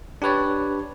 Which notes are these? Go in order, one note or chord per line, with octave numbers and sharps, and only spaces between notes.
D4 G4 B4 C#5 D5